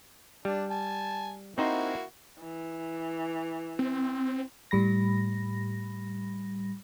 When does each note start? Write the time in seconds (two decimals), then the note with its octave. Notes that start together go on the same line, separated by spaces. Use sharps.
0.45 G3 D4
0.71 G#5 A5
1.58 A#3 C4 D#4 E4 F#4 C5
2.40 E3
3.79 C4
4.71 A2 G3 B5 A#6